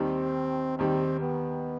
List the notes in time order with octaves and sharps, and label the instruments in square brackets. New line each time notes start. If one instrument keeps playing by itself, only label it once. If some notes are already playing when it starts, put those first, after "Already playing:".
Already playing: [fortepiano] D#2 D#3 G3 [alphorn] C4
[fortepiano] D#2 D#3 G3 [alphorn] C4
[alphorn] B3